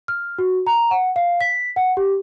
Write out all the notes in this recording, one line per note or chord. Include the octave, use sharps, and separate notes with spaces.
F6
F#4
A#5
F#5
F5
B6
F#5
G4